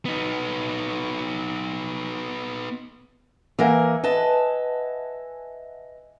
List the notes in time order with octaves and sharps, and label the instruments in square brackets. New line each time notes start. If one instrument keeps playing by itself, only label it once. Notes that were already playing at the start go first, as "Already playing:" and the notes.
[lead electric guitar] B3 D#4
[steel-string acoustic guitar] E3 A#3 A#4 [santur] E5 F#5 G#5
[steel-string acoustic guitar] B4 D#5 A5